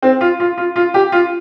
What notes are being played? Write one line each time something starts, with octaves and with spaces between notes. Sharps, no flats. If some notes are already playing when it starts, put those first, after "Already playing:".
C4
F4
F4
F4
F4
G4
F4